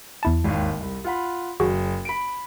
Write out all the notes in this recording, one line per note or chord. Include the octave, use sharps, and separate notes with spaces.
E2 E4 A5
G#1 D#2
C2
F4 F#5 B5
F#1 F#4 G#4
B5 D7